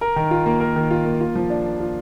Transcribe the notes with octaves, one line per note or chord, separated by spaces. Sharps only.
A#4
D#3
F4
A#3
A#4
D#3
F4
A#3
F4
F3
D4
A#3
F4